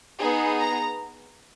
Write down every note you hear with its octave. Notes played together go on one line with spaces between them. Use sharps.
B3 D#4 G#4 G#5
A#5